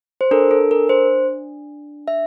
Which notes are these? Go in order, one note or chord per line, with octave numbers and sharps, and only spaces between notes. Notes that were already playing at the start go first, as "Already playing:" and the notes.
C5
D4 A4 A#4
A4
A#4
C5
E5